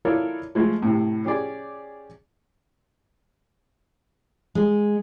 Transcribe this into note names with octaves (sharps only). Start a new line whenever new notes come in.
E4 F4 A4 A#4 C#5 D5
F3 G#3 A3
A2 C3
C#4 G4 G#4 D5
G#3